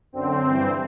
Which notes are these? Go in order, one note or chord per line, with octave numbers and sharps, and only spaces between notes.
F#2 D3 C4
G2 E3